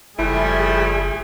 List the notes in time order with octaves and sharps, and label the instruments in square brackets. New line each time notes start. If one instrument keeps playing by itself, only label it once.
[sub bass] F#1 [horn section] F3 G3 A3 [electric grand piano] E4 [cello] G#4